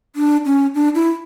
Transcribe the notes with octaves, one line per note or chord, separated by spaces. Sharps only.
D4
C#4
D4
E4